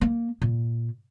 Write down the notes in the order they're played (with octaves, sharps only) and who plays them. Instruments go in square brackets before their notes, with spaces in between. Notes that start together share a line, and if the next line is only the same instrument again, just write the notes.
[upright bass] A#3
A#2